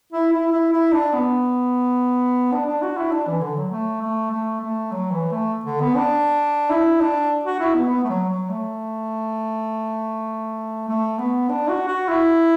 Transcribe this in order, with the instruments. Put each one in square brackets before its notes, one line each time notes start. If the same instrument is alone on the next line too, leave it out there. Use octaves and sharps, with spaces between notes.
[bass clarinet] E4
E4
E4
E4
D4
B3
D4
D4
F#4
E4
D4
E3
D3
F#3
A3
A3
A3
A3
F#3
E3
A3
D3
B3
D4
E4
D4
F#4
E4
B3
B3
A3
F#3
F#3
A3
A3
B3
D4
F#4
F#4
E4